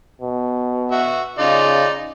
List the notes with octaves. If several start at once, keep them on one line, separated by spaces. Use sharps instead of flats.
B2
F#4 E5
C#3 D#4 F4 D5